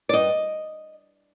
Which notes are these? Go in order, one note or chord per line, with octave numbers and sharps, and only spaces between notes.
D5
G2 D#5